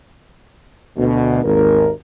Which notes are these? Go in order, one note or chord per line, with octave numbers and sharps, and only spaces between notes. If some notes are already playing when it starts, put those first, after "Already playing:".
D2 B2
G#1 D#2 A#4